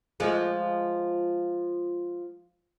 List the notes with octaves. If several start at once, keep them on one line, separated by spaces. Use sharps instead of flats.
F3 G#3